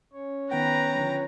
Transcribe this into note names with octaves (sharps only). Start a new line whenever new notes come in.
C#4 C#5
D#3 B3 B4 F#5 G5 A#5
D3 F3